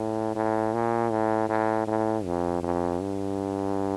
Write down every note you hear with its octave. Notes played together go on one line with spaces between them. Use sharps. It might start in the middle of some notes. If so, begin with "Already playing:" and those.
Already playing: A2
A2
A#2
A2
A2
A2
F2
F2
G2